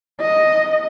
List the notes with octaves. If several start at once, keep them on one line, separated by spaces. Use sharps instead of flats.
D#5